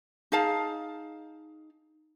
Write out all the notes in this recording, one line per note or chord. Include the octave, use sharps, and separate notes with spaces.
D#4 G#4 F5 A5